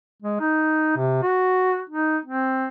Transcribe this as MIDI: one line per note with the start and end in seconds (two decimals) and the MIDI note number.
0.22 0.38 56
0.40 0.96 63
0.97 1.22 48
1.22 1.81 66
1.90 2.18 63
2.25 2.67 60